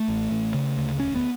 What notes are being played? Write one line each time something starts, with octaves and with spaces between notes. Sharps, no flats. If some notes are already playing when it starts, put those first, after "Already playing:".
Already playing: A3
A1
A1
C#3
D2
E1 C#4
B3